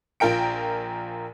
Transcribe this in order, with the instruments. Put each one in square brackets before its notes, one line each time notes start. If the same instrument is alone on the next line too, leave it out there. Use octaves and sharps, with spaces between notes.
[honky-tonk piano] A#1 F4 A#4 G5 D7